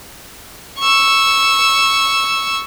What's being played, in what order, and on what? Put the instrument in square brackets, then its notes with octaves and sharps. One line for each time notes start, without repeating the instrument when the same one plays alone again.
[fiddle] C#6 E6